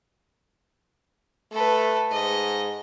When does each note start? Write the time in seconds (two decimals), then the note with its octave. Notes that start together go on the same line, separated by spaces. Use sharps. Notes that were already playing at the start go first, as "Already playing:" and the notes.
1.52 A3 A4 B4
2.11 G#2 D#5